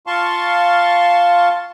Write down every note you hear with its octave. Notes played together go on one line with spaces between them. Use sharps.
F4 F5 A5 C6 C#6